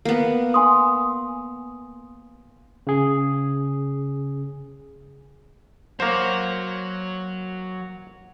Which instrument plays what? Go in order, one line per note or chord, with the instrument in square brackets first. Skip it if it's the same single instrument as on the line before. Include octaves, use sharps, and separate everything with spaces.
[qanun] A#3 B3
[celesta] G#5 C6 D#6
[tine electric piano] C#3 G#4
[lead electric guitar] F#3 F#4 [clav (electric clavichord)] A#3 C5